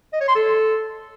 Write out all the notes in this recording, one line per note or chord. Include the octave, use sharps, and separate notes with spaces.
D#5
C#5
C6
A4